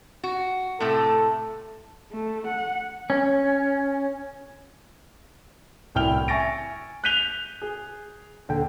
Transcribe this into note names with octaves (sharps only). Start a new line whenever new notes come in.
F#4
A2 C3 A3 A4
A3
F#5
C#4
D1 C2 E4 G5 F6 G7
E5 G#5 C#6 A6 A#6 D7
F#6 G6 B6 D#7 F7 G7
G#4
D#1 D3 G5